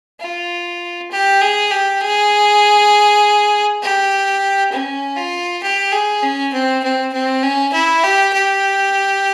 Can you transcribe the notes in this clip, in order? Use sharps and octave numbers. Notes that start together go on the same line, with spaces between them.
F4
G4
G#4
G4
G#4
G4
C#4
F4
G4
G#4
C#4
C4
C4
C4
C#4
E4
G4
G4